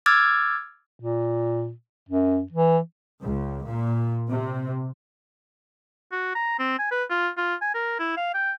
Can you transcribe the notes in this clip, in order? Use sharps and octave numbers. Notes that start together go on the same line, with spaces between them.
D6 E6 F6 G#6 A6
A#2
F#2
E3
C#2
A#2
C3
F#4
A#5
C4
G#5
B4
F4
F4
G#5
A#4
E4
F5
G5